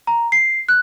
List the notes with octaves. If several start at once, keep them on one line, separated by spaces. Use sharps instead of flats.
A#5
C7
F#6